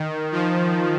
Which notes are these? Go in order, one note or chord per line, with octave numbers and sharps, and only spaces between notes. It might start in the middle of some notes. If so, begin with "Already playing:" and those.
Already playing: D#3
F3